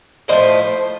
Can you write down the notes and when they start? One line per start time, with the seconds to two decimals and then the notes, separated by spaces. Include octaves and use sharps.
0.28 A2 F3 A3 C5 D#5